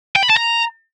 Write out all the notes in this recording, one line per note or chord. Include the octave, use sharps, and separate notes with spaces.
G5
B5
A5
A#5